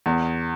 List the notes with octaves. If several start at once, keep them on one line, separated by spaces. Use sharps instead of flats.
E2